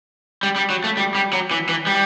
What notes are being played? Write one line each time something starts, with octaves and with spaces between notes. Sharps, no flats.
G3
G3
F#3
A3
G3
G3
F#3
E3
E3
G3